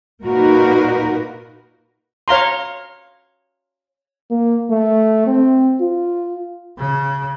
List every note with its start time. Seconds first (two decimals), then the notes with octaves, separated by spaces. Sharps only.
0.23 A#2 D#4 F#4 A#4 B4
2.28 C#5 F5 A#5 C6
4.31 A#3
4.70 A3
5.26 C4
5.80 F4
6.78 C#3